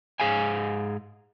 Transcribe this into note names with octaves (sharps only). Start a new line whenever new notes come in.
G#2 G#4 F5 G#5